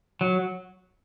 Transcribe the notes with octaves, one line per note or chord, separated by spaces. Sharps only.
F#3